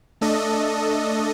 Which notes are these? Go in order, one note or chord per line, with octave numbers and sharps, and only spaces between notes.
A3 D4 A4 D#5